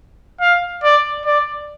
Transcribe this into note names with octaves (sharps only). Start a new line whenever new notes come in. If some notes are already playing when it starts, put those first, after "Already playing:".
F5
D5
D5